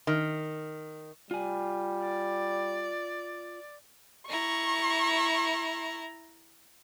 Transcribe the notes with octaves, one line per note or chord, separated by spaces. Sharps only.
D#3
G3 F4 G#5
D5
E4 A#5 C#6